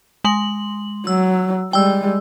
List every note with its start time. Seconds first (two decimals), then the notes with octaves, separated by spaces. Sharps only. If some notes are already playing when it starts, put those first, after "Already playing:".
0.24 G#3 C6 F#7
1.07 F#3 E6
1.73 G3 G#3 G5 E6